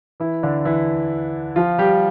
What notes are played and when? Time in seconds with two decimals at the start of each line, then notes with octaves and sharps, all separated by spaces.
0.20 E3 E4
0.43 D3 D4
0.65 E3 E4
1.56 F3 F4
1.78 G3 G4